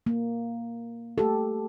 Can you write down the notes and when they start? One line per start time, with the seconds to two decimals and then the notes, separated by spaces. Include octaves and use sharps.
0.06 A#3
1.18 A3 G4 A4